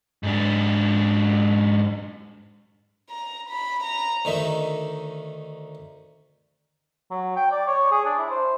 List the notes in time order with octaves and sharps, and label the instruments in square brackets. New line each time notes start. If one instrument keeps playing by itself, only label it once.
[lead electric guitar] G#2 D4
[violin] A#5
B5
A#5
[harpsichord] D2 D#3 D#4 E5
[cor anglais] F#3
G5
D5
C#5
G#4
D4
E4
C5